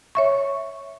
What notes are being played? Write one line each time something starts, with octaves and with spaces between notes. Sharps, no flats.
C#5 E5 C#6